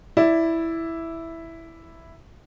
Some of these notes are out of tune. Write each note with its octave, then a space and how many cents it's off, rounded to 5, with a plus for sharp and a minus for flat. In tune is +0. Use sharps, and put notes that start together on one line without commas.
E4 +0 D5 +0